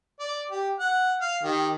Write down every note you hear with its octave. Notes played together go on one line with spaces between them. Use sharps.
D5
G4
F#5
F5
D#3 G4